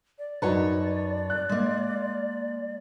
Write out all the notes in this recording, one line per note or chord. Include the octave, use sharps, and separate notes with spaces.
D5
F#2 D#4 F#4 B4 C#5 D5 A5
F#6
G#3 A#3